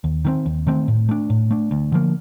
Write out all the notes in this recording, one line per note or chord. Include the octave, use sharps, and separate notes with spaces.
D#2
D#3 A3 C4
D#2
D#3 A3 C4
A2
A3 D4
A2
A3 D4
D2
D3 F3 A#3